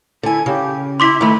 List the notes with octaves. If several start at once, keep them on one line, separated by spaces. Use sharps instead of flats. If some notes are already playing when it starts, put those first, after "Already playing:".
D3 E4 G#5
C#3 G4
E4 C6 D6 B6
D#3 A3 B5